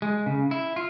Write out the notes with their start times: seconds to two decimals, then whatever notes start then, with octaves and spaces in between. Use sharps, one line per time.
0.02 G#3
0.26 C#3
0.51 E4
0.76 F4